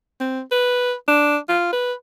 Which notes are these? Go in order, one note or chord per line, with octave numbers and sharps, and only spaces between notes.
C4
B4
D4
F4
B4